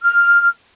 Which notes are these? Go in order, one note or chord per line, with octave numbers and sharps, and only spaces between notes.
F6